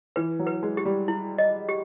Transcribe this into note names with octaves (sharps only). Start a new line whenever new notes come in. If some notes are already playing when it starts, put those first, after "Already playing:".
E3 B4
F#3
B4
G#3
G4
G3
E4
D#5
G4